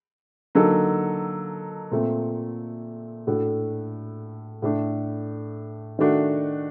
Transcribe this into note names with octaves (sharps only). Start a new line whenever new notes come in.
D3 F#3 A#3 D#4 A4
A#2 A3 C4
A2 A3 D4 F#4 A4
A2 A3 D4
D#3 A3 D4 F#4